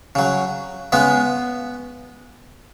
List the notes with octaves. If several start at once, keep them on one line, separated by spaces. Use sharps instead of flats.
C#3 F#3
C#3 G#3 B3